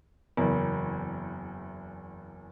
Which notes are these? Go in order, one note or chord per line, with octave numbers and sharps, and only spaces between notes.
F#1 E2